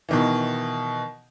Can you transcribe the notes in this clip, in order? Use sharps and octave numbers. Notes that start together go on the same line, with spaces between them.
B2 D#3 E3